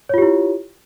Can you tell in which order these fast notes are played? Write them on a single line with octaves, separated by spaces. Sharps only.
C#5 F4 G4 E4